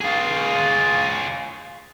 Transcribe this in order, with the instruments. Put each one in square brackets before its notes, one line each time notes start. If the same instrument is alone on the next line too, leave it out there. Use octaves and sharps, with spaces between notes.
[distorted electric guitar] F4 G#4